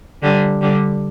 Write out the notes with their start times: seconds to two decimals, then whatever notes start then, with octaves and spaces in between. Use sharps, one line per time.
0.23 D3 G3
0.61 D3 G3